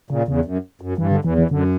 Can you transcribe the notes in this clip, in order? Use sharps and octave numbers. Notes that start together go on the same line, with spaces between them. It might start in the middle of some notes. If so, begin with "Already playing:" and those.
A#2 C#3
E2 C#3
F#2
F#2
G2 E3
D3
E2 E3
E3
F#2 D3